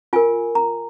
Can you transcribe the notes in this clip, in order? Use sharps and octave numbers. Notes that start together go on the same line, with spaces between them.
F4 A#4 G#5
A#5